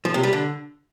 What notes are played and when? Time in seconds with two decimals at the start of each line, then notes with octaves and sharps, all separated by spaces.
0.05 F3
0.14 C3
0.23 G3
0.33 D3